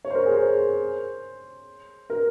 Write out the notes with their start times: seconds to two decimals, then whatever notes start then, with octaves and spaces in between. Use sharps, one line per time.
0.05 C#5
0.10 C5
0.15 A#4
0.26 G#4
0.36 C5
2.10 A#4